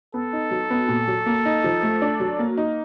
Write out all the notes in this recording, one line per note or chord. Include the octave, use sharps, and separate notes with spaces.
B3 A4
D#4
F#3
B3
A#2
F#3
A#3
D#4
F3
A3
D4
F#3
A#3
D#4